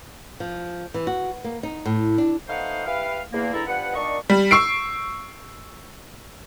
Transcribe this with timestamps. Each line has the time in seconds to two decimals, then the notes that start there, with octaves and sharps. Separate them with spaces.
0.40 F3
0.94 E3
1.07 F#4
1.44 A#3
1.63 D#4
1.86 A2
2.18 D4
2.47 A3 B3 D#4 C5 F5 F#5
2.85 E4 G4 B4 F5
3.31 E2 A#3
3.52 E2 D3 E3 E4 A4 A#5
3.67 G2 F3 B3 F#5
3.94 A#2 D#3 D4 D#5 C#6
4.30 G3
4.51 C#6 E6 C7 D7